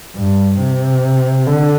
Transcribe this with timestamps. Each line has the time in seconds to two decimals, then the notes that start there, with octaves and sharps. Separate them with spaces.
0.17 G2
0.60 C3
1.47 D3